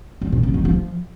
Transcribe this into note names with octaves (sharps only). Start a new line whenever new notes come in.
F#3
A#2
C#3
D#3
F3